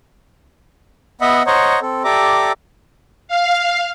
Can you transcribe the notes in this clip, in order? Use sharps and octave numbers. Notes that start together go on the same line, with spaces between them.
B3 D#5 E5 F#5 B5
C5 C#5 D#5 F#5 A#5
C4 A4
G4 A4 D5 E5 A#5 D6
F5